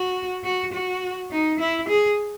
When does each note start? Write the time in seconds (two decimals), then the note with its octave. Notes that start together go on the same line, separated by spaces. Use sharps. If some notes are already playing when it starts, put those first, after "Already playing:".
Already playing: F#4
0.44 F#4
0.73 F#4
1.31 D#4
1.59 E4
1.88 G#4